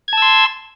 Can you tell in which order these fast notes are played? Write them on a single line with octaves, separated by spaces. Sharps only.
G#6 A5 E6 C6